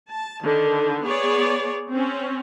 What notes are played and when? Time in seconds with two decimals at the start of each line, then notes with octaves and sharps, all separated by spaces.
0.11 A5
0.44 D3 D#3
1.04 B3 G#4 C#5 D5
1.91 C4 C#4